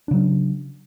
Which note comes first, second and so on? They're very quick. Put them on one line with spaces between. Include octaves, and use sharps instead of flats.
D4 C#3 F#3